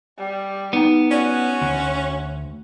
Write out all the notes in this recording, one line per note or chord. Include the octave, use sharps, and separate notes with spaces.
G3
B3 D#4 A#5
C#4 F#4 D5
D2